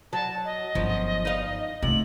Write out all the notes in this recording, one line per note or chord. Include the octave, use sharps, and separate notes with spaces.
F#3 A5
D#5
G1 F#2 F3
D#4 F5
C3 A3 F4 F#7